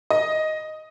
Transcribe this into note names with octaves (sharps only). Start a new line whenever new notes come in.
D#5